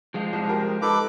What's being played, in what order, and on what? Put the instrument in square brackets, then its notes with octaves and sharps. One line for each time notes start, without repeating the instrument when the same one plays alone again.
[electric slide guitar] F3 G#3 F4
[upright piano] C2
G4 A#4
[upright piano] D#4 [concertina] A4 B4 D6